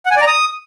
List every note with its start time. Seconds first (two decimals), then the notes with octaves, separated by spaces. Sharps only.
0.06 F#5
0.11 G#5
0.16 D5
0.22 A#5
0.27 D#6